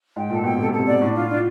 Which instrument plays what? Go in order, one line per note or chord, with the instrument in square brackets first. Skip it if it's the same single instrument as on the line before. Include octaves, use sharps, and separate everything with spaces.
[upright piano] G#2 [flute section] G5
[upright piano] A#2 [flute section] A4
[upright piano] B2 [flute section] G5
[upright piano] C3 [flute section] A4
[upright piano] C3
[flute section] A4
[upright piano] C3
[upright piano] B2 [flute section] D5
[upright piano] A2 [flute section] D4
[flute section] F4
D4